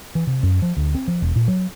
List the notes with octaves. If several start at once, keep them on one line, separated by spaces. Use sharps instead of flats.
E3
C3
F#2
F3
D2
C4
F3
E1
A#2
F#3